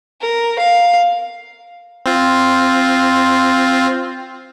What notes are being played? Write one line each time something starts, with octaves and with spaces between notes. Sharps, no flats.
A#4
F5
C4 F4